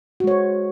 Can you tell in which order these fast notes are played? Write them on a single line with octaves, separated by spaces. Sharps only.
F#4 G#3 C#5 C5